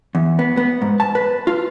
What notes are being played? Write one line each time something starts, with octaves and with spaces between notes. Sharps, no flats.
E2
B3
B3
G#2
A5
B4
F4